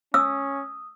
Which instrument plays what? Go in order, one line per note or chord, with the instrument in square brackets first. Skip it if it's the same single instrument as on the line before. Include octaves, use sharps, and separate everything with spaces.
[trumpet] C#4 [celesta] D#6 [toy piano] E6